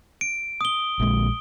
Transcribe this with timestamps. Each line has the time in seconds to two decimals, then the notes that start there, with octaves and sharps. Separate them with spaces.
0.21 D7
0.61 D#6 G7
0.99 A#1 G#3